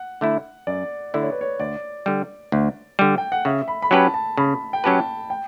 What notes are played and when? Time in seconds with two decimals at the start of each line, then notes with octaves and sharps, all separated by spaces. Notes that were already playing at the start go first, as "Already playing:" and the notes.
Already playing: F#5
0.21 D3 A3 E4
0.67 F#2 D5
1.14 D3 A3 E4 D5
1.22 C#5
1.32 B4
1.41 C#5
1.60 D2 D5
2.06 D3 G3
2.52 D2
2.99 D3 G3
3.18 G5
3.32 F#5
3.45 C#3 E5
3.68 B5
3.82 B5
3.91 F#3 C#4 G4 B4 A5
4.14 A5
4.37 C#3 B5
4.73 G5
4.84 F#3 C#4 G4 B4 A5
5.30 G5